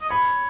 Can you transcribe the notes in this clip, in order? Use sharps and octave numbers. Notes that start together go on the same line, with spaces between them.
D#5
C#5 B5